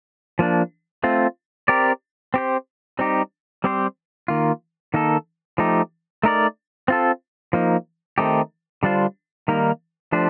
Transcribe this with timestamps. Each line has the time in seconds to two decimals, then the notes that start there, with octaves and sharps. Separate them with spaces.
0.39 F3 A#3 D4
1.04 A3 C4 F4
1.68 C4 G4 A#4 D5
2.34 C4 G4 C5
2.99 G3 C4 D#4 G4
3.64 G3 C4 G4 C5
4.28 D#3 A#3 F4
4.94 D#3 A#3 D#4 A4
5.58 F3 A3 D#4 G4
6.23 A3 D#4 A#4 D5
6.88 C4 F4 A4
7.53 F3 A#3 D#4
8.18 D#3 A3 C4 D#4 G4
8.83 D3 G3 D4 F4 C5
9.48 D#3 G3 A#3 D#4 A#4
10.12 F3 A3 D4 G4 C5